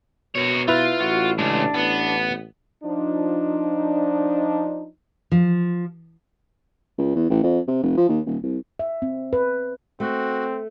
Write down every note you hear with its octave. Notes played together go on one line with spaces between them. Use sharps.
B2 A#4 C#5
E4 F4 B4
A1 F#4
C#3 G#3 D4
A1 B3
F3 D4 D#4
F3
C#2
E2
A1
F2
C3
F1
F3
D#2
D#1
C2
E5
C4
B4
A3 C4 F#4